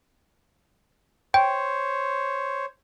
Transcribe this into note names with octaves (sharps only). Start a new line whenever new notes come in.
C5 C#5 G5